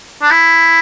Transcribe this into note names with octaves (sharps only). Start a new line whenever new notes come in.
D4
E4